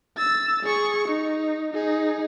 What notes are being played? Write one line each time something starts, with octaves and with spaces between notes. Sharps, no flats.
E6 A6
G#4 C#6
D#4
D#4 G#4